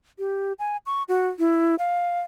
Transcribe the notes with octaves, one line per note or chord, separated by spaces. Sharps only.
G4
G#5
C#6
F#4
E4
F5